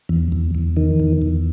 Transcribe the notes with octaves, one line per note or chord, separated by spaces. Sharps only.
E2
E2
E2
D#3
E2
E2